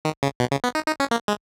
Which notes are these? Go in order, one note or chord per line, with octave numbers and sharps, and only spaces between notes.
D#3
C#3
B2
C#3
B3
D#4
D#4
C#4
A#3
G#3